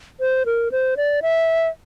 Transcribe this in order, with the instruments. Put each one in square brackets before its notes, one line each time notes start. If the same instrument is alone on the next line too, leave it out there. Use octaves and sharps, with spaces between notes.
[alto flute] C5
A#4
C5
D5
E5